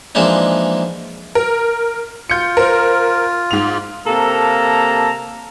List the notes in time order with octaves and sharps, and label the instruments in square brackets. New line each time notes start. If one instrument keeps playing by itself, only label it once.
[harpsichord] E3 F3 G#3 A#3 D4 D#4
[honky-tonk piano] A#4
[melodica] F4 [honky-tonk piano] G6 C#7
[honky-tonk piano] A#4 C5
G#2 F7
[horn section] C3 A#3 A4 A5 A#5